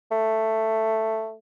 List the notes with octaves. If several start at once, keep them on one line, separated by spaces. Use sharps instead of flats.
A3